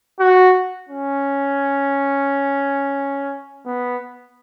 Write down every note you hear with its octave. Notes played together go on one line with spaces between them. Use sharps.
F#4
C#4
B3